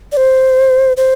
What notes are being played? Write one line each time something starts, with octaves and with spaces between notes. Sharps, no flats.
D5
C5
C5